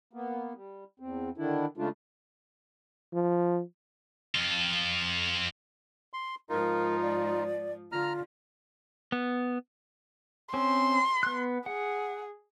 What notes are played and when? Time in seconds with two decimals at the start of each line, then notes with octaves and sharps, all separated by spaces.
0.13 A#3 B3
0.54 G3
1.00 E2 C4
1.38 D3 D#3 D4 E4
1.77 C#3 G#3 A3 D4 F4
3.14 F3
4.35 F2 F4
6.13 C6
6.49 G#2 F3 D#4 F4 A#4
7.02 D5
7.92 D3 F4 A#5 F6
9.12 B3
10.54 C4 C#4 C5 C6
11.23 B3 F#6
11.66 G#4 F#5